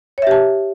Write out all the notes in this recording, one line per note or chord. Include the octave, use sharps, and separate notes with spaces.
G4 C#5 E5 A5